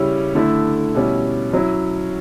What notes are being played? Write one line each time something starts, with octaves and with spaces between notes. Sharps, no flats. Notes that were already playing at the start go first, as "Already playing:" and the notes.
Already playing: C#3 G3 C#4 E4
D3 A3 E4
B2 G3 C#4 E4
F#3 C#4 E4